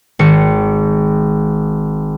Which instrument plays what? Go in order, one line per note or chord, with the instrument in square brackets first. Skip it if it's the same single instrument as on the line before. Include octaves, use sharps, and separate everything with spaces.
[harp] G#1 C#7